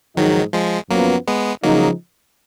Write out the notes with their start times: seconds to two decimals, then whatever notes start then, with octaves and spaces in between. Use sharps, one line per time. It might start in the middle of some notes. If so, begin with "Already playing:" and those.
0.17 G#2 D#3 F3 F#3 G#3 D#4
0.53 F3 G#3
0.90 F#2 F3 F#3 A#3 B3
1.28 G#3 B3
1.63 C#3 F3 F#3 G#3 A#3 D#4